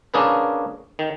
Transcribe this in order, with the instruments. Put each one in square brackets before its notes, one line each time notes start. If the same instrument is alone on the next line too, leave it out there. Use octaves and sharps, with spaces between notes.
[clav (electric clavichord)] A#3 C#4 D4 G#4 A#4 B4
D#3